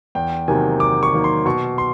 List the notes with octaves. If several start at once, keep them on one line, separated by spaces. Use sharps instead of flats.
E2 G5
C3 D#3 F#3 A#3 G#5
E2 D6
C#6
C3 D#3 F#3 A#3
C6
B2 C#6
C6